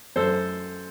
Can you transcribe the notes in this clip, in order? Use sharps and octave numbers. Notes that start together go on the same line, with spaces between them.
F#2 A4 C5